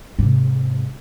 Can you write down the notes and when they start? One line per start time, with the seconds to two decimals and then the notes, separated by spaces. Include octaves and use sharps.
0.19 G#2 C3